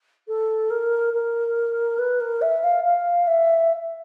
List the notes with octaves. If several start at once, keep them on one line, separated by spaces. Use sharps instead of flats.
A4
A#4
A#4
B4
A#4
E5
F5
F5
E5